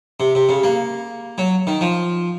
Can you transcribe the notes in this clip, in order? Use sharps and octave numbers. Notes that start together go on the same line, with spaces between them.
C3
C3
C#3
A#3
F#3
D#3
F3